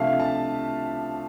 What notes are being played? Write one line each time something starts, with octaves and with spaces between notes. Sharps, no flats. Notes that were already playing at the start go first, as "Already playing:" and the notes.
Already playing: C3 F3 A3 D4 E5 F5
A5